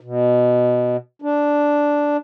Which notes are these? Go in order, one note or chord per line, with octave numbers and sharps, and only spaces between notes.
B2
D4